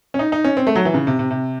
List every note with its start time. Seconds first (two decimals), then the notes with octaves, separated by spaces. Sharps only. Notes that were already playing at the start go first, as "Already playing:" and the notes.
0.14 C#4
0.19 D#4
0.32 D#4
0.44 C#4
0.57 C4
0.67 A3
0.75 F#3
0.85 E3
0.94 C#3
1.07 C3
1.19 C3
1.31 C3